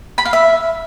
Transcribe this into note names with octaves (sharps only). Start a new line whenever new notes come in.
B5
F5
E5